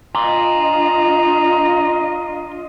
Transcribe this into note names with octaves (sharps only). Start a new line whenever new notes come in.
D4 F4 D#5 A#5 C6